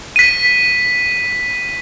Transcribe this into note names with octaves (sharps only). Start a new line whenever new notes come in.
B6 D#7